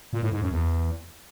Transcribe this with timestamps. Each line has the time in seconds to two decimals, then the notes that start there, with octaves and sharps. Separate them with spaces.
0.13 A#2
0.22 A2
0.32 G#2
0.42 F#2
0.51 E2